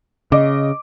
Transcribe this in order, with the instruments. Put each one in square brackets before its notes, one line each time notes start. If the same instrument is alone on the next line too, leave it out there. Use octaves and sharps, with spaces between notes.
[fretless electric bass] C#3 [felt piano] D#5 D6